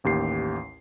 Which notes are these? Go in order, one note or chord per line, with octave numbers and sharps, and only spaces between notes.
A1 D#2 G4 C7